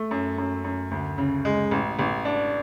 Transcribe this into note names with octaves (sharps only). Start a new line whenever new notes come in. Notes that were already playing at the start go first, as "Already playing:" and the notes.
Already playing: A3
F#2
F#2
F#2
D2
C#3
G#3
A1
A1
D4